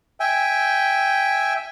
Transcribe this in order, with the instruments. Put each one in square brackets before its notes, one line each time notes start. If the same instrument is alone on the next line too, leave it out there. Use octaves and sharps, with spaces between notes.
[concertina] E5 G5 G#5